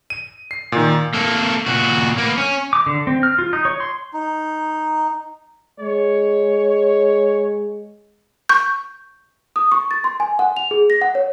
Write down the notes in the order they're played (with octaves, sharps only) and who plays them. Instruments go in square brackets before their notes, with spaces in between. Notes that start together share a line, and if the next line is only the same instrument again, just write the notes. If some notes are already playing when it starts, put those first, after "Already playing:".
[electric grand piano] D#7
C7
A#2 D#3
[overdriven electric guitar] A#3 A4
A#2 F#4
A#3 B3
C#4
[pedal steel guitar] D6
D3
C4
F6
F4
D#4
C#5
C6
[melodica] D#4
[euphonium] G#3 [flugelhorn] C#5
[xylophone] C#6 G6
[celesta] D#6
C#6
A6
C6
G#5
F#5
F7
G#4
A#6
F#5
C#5